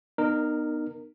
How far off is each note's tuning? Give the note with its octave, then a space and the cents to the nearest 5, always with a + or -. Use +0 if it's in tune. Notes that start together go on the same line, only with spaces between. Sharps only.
B3 +0 D#4 -30 A#4 +0